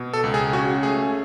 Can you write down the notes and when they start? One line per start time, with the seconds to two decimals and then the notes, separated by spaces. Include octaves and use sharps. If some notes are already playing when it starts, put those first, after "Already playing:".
Already playing: B2
0.13 A4
0.24 C#2
0.34 G#4
0.53 C#4 F#4
0.83 A3 G#4